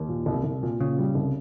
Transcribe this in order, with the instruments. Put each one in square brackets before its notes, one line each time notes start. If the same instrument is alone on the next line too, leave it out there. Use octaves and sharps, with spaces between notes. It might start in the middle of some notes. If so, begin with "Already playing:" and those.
Already playing: [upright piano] D#2
A#2
C2
C2
A#2
[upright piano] A#2 [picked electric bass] C#3
[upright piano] G3
C2